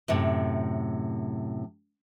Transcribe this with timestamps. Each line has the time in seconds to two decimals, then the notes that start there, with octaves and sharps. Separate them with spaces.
0.08 F#2 A2 C3